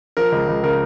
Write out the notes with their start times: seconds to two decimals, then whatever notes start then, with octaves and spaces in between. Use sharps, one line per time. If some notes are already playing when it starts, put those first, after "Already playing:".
0.17 F3 A#4
0.32 C#2
0.48 C#2
0.63 C#3 A#4